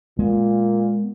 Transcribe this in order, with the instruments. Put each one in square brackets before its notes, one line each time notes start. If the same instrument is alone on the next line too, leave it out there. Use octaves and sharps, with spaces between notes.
[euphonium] A#2 [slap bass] G#3 B3